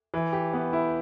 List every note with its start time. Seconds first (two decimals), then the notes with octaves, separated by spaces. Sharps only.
0.14 E3
0.33 G4
0.53 B3
0.73 E4